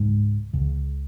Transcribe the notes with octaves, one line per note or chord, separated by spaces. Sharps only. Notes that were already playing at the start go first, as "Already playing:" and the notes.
Already playing: C#2 G#2 C#3 G#3
C#2 C#3